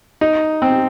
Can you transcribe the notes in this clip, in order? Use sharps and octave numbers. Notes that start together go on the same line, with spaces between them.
D#4
C4